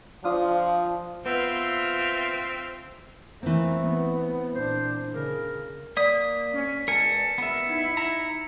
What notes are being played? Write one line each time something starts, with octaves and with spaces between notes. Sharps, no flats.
F3 D4 F4 D#6
B3 C4 F4 E5
E3 A3 A#3 C4
B3
A#2 D4 C5
C#3 A#4
A#3 D5 D#6 B6
C#4
E2 G#3 A#4 G#5 A5 C#7
F#1 B3 A#4 E5
D#4 E4
E5 A#5